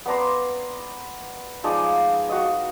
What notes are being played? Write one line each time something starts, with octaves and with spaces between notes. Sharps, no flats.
B3 D5 A#5 C6
F3 G#3 D#4 D5
F#4 D#5